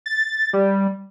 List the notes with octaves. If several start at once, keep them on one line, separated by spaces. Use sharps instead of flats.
A6
G3